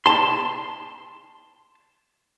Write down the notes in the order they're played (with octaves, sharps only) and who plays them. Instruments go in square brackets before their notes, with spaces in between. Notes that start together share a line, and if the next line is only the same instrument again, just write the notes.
[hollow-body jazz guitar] A5 C6